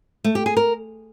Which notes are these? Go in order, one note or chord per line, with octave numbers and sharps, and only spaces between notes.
A3
G4
G#4
A#4